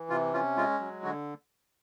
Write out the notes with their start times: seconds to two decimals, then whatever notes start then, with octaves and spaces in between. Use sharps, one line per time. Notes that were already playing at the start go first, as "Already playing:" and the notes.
Already playing: E3
0.10 C3 F4
0.33 C#4 F4
0.57 G#3 F4
0.80 F#3
1.04 D3 F#4